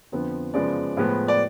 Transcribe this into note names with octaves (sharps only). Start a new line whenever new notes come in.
F2 D3 F3 B3
F#2 C#3 F3 G#3 B3 D5
A2 F3 G#3 B3
D5